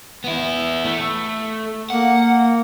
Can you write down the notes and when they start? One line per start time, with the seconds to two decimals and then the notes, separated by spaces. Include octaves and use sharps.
0.24 B3 E4
0.84 A3
1.90 A#3 F#5